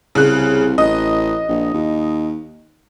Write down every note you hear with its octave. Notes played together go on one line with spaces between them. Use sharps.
C2 C#3 F#6
A1 D#5
A#1
D#2